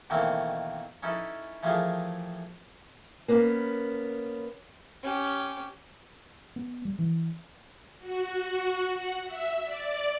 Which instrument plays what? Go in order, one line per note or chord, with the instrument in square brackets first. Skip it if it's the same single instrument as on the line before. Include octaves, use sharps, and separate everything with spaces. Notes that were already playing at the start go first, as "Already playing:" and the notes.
[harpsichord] B2 D#3 E3 A3 A#3 C4
C#4 D#4 E4 A4 B4
E3 F3 A3 G4 G#4 A#4
[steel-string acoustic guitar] A#3 B3 C#4
[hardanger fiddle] C#4 G4
[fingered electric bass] B3
G3
E3
[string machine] F#4
F#4
F#5
E5
D5